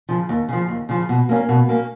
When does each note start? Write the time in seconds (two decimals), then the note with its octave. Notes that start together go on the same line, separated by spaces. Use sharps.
0.09 C#3 F3
0.29 D#2
0.49 C#3 F3
0.69 D#2
0.89 C#3 F3
1.09 B2
1.29 A#3 C#4
1.49 B2
1.69 A#3 C#4